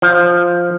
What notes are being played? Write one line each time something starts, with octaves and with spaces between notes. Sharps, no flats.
F3